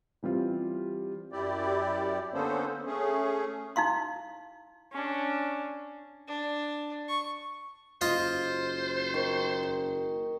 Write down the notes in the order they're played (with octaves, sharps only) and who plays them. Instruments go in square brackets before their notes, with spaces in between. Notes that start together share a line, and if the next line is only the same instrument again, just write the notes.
[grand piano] E3 G3 C4 F4
[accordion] F#2 E4 G4 D5
D3 A#3 B3 C#4 A4 C5
A3 C#4 G#4
[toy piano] D#4 E4 F5 C6
[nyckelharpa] C#4 D4
[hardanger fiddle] D4
C#6
[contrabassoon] F#1 [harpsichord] F4 D#5 [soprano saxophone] C5
[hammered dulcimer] D#3 C#6